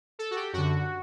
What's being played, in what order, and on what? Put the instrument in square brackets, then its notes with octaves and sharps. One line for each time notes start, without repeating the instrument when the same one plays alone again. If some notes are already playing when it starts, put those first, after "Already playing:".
[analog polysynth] A4
F#4
G4
F#2 D3 F#4